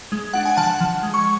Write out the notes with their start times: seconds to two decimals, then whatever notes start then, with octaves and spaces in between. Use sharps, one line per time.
0.12 G#3
0.33 D4 F#5
0.45 G#5
0.57 F3 F#5 A5
0.81 F3
1.03 G#3
1.14 C#6